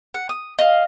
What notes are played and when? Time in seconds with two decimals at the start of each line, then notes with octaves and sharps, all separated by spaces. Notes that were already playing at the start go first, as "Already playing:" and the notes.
0.14 F#5
0.29 D#6
0.59 D#5 F5